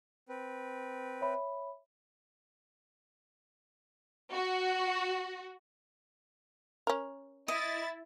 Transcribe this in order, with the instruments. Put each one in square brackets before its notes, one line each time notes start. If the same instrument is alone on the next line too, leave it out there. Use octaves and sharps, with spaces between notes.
[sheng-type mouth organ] C4 B4
[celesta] C#5 E5 B5
[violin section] F#4
[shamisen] C#4 A#4
[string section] E4 A6 [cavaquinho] D#5